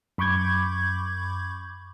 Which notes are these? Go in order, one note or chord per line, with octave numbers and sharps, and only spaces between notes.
F#2 B5 C#6 D6 G6 G#6